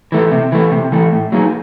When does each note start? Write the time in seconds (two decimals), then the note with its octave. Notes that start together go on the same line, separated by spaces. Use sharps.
0.12 E3 A3
0.32 C3
0.52 E3 A3
0.72 C3
0.92 E3 A3
1.12 A2
1.32 F#3 A#3 D#4 G#4